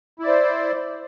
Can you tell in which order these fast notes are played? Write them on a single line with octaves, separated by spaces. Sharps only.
E4 D5 C5